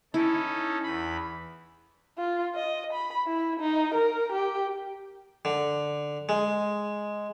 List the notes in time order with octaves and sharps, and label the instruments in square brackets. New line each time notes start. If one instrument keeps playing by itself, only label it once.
[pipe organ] C#4 D#4 A4 [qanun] E4
[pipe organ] E2 B5
[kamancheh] F4
D#5
B5
E4
D#4
A#4
G4
[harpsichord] D3
G#3